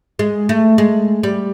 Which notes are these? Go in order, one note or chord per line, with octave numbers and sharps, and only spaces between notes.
G#3
A3
G#3
G3